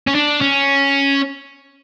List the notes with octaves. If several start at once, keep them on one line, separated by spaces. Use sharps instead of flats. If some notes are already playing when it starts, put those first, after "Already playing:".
C#4
D4
C#4